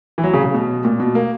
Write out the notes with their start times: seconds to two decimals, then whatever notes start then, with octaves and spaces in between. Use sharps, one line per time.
0.18 E3
0.24 F#3
0.34 C#3
0.44 C#3
0.54 B2
0.85 A#2
1.00 B2
1.15 A#3